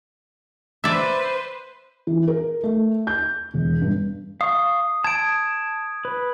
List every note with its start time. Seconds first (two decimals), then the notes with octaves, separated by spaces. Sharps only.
0.84 B4 C5 D5 E5
2.07 E3
2.28 A#4
2.63 A3
3.07 G6
3.54 E1
3.81 G2
4.41 F5 C#6 D#6
5.04 A5 D#6 G#6 D7
6.05 B4